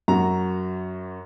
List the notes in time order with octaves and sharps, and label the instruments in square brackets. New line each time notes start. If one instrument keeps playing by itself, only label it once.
[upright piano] F#2 F#4 A#5